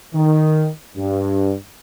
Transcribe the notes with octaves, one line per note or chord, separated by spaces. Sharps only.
D#3
G2